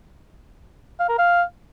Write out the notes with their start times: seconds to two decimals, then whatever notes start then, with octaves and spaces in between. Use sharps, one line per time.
0.99 F5
1.09 A#4
1.18 F5